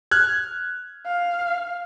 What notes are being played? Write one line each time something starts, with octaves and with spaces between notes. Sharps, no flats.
F6 F#6 G#6
F5